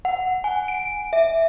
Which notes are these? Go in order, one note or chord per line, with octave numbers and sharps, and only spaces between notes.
F#5
G#5
D7
E5